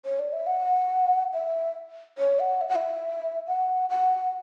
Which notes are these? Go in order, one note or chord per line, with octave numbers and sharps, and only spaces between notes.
C#5
D5
E5
F#5
E5
C#5
F#5
E5
F#5
E5
F#5
F#5